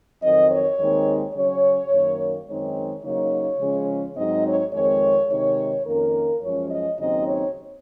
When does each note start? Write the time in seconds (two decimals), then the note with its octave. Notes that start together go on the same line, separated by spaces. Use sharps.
0.22 F2 D#3 F#3 C4 D#5
0.51 C#5
0.78 D#2 D#3 G#3 C4 D#4
1.35 C#3 F#3 C#4 C#5
1.92 F#2 D#3 A#3
2.48 F#2 D#3 G#3 C4 D#4 C#5
3.04 C#3 F#3 A#3 D#4 C#5
3.60 C#3 F3 G#3 C#4
4.17 G#2 F#3 C4 D#4 D#5
4.45 C#5
4.73 F2 D#3 G#3 C4 C#5
5.29 C3 D#3 G#3 D#4 C#5
5.86 F2 D#3 A#3 C#4 A#4
6.43 F#2 F3 G#3 C#4 C#5
6.71 D#5
6.99 D#2 C#3 F#3 C4 D#4 D#5
7.27 C#5